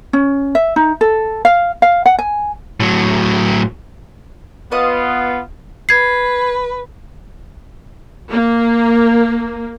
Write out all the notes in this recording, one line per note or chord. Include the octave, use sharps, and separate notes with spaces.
C#4
E5
D#4
A4
F5
F5
F#5
G#5
A2 F#3
B3 F4 B4 D#5 D#6
B4 G#6 C7
A#3